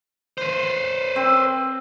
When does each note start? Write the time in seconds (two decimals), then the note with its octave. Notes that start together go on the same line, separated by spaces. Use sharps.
0.38 B4 C5
1.16 C4